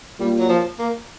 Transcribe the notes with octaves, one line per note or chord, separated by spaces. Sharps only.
A#2 G3
F#3
F3
A#3